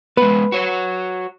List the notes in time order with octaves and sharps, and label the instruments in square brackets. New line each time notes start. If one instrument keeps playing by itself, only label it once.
[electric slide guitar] G#3 B3 [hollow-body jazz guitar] B4
[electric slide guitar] F#4 C#5